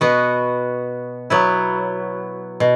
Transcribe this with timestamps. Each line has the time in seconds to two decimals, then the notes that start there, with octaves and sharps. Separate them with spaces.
0.01 B2 B3 F#4
1.30 F#3 B3 E4
2.60 B2